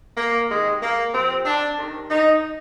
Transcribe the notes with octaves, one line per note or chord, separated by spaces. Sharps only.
A#3
C3 D#3 G#3
A#3
C3 F3 C4
D4
C3 D#3
D#4